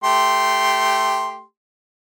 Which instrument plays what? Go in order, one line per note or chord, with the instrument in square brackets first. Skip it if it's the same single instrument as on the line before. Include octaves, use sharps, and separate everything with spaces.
[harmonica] A3 G4 C6